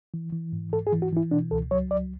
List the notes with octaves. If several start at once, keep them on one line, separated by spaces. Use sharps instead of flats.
E3
E3
G#2
G#2 A4
G#4
E3
F#4
E3 E4
B2 D4
C#2 A4
F#3 C#5
C#2 D5